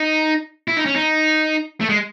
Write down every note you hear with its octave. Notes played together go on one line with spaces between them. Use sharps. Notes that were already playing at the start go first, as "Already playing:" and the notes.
Already playing: D#4
E4
D#4
C#4
D#4
A3
G#3